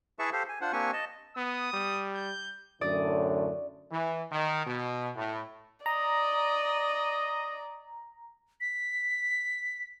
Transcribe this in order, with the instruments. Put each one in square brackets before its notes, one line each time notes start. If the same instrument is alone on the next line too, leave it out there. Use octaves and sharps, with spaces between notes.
[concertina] E4 G#4 B4 E5 A5 C#6
G4 A4 C5 F5
G#5
D4 F4 C5 F#5
A#3 C4 D4 G4 G#5 C#6
D#5 A5
[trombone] B3 [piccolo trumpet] D#6
[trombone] G3
[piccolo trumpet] G6
[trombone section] F#2 A2 D3 [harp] D5 D#6
[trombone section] E3
D#3
B2
A2
[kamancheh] D5 [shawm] D#5 [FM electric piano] A#5
[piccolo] B6